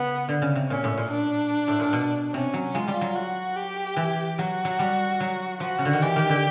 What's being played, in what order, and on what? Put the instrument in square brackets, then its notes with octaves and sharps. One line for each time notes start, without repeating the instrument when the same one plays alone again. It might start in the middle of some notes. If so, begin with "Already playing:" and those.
Already playing: [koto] C#3 [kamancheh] B3
[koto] D3
C#3
C3
[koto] A#2 [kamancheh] C#4
[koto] A2
A#2
[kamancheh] D4
[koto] A2
A#2
B2
[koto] C3 [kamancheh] C#4
[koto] F#3
[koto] G#3 [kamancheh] F4
[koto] G3
F#3
[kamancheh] F#4
G4
[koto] E3
[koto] F#3 [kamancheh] F#4
[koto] F#3
G3
F#3
[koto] F3 [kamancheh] F#4
[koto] C#3
D3
D#3
[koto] E3 [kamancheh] G4
[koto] D#3
D3